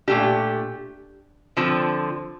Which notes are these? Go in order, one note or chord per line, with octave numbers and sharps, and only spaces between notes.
A#2 A3 D4 G4
D3 F3 C4